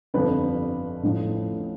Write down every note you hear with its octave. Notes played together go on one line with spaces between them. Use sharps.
G1 F2 D3 F3 B4
A1 A2 F3